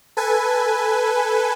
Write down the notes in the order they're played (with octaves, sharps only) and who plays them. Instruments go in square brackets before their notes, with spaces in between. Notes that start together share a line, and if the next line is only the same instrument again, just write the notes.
[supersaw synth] A4 B4 G#5